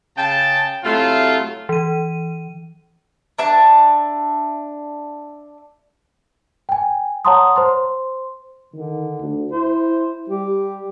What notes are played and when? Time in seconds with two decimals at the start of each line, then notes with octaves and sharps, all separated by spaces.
0.17 C#3 G5 A5
0.85 C3 F#3 A3 E4 F4
1.69 E3 D#7
3.39 D4 E5 A5
6.69 G5 G#5
7.25 C#5 F#5 A5 A#5 C6 D#6
7.56 C5 C6
8.74 D3 D#3
9.21 D2
9.52 E4 C5
10.29 G3 G4